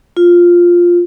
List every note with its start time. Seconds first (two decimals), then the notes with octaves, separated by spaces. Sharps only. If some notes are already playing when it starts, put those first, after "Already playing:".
0.17 F4